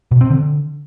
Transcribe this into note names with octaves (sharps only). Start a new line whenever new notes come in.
B2
C4
D3